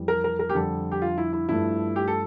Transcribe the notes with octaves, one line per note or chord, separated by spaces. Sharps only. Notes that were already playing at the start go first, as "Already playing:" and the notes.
Already playing: F2 E3 G3
A#4
A#4
A#4
G4
F2 D3 G3 A4
G4
F4
E4
E4
G2 F3 A3 E4
G4
A4